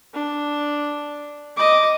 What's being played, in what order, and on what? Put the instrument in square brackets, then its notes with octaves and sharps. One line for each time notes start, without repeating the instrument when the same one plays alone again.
[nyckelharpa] D4
D#5 D6